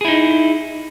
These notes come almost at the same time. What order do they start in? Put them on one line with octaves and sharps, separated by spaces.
G#4 E4 D#4